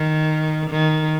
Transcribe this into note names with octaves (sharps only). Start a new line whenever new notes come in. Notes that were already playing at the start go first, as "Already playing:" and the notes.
Already playing: D#3
D#3